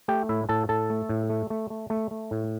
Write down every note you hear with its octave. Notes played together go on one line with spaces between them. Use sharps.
A3 G4 G5
A2 E4 E5
A2 A4 A5
A2 A4 A5
A3
A2
A3
A3
A3
A3
A3
A2